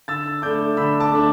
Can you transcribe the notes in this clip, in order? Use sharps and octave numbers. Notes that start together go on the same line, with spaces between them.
D3 E6 A6
A3 D4 D6 G6
D3 B5 E6
A5 D6
A3 D4